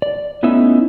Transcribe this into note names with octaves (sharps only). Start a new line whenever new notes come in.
D5
A3 B3 C#4 D#4 E4 E5